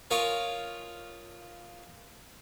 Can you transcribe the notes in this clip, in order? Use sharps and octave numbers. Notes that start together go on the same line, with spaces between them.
F4 A#4 C#5 D#5 F5 G#5